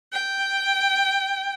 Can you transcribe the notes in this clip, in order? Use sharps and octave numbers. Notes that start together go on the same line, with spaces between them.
G5